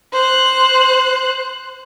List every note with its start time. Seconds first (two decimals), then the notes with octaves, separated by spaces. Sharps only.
0.13 C5 F#6